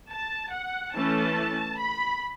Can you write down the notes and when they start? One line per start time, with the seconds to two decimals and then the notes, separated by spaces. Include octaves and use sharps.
0.11 A5
0.53 F#5
0.95 E3 A3 C#4 A5
1.79 B5